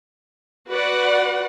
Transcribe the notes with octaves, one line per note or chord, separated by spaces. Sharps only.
F#4 B4 D5 F#5